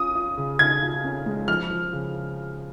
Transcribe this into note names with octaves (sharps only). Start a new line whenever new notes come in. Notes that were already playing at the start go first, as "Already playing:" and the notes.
Already playing: C#4 F4 D#6
F4
C#3
C#3 G#6
F4
C#4
G#3
F3 F6
F3
C#3